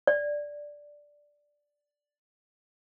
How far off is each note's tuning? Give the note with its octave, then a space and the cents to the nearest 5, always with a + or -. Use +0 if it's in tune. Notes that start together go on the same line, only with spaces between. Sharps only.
D5 +0